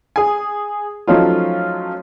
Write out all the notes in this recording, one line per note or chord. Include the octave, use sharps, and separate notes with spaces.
G#4 G#5
F3 F#3 A3 C#4 D#4 F4